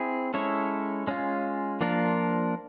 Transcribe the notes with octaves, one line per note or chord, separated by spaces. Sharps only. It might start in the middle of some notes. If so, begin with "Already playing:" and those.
Already playing: C4 E4 G#4
G#3 C#4 E4 A4 C#5
G#3 C#4 F4
F3 A#3 D4 F4 A#4